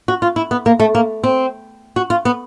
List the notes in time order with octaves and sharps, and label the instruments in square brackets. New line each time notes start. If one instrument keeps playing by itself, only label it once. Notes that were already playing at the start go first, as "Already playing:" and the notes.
[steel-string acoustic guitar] F#4
F4
E4
B3
A#3
A3
A#3
C4
F#4
F4
B3